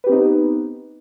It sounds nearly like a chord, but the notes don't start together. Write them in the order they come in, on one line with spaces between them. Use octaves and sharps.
B4 G4 C4 D#4 B3